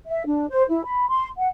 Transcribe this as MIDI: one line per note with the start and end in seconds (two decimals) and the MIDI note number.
0.07 0.23 76
0.26 0.45 62
0.50 0.64 72
0.69 0.82 64
0.85 1.08 83
1.09 1.27 84
1.38 1.48 78